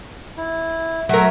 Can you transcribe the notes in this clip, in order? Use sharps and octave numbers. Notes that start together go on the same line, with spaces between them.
E4
F#3 A3 A#4 E5